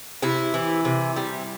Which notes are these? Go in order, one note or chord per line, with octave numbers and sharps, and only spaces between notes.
C3 E4
E3
C3
G3